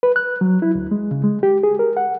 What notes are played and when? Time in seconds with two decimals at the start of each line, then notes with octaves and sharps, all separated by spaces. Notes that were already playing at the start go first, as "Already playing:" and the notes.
0.03 B4
0.16 F#6
0.41 F#3
0.62 E4
0.75 D2
0.91 G#3
1.11 C#3
1.24 G#3
1.43 G4
1.63 G#4
1.79 A#4
1.97 F#5